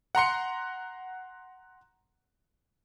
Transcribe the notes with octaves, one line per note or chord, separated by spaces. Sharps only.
F#5 A#5 C6 C#7